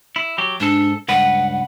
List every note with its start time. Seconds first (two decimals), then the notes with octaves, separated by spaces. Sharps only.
0.16 E4
0.38 F#3 G4
0.60 G#2 D4 A4
1.08 C#2 G2 B4 F#5